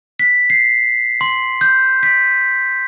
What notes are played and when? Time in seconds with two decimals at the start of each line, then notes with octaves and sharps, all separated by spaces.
0.19 B6
0.50 C7
1.21 C6
1.61 G6
2.03 B6